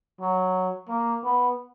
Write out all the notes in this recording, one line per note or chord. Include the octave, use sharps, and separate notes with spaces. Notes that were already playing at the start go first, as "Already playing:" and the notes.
F#3
A#3
B3